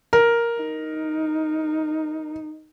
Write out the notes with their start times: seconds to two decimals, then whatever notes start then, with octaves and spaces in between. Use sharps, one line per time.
0.13 A#4
0.61 D#4